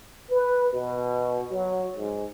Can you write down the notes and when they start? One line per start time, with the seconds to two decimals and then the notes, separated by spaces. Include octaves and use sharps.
0.30 B4
0.73 B2
1.51 F#3
1.96 G#2